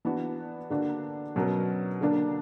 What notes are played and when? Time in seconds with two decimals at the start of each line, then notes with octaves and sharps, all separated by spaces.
0.05 E3 B3 D4 F#4
0.70 D3 A#3 D4 F#4
1.36 B2 F#3 C#4 F#4 A#4
2.01 D3 A#3 D4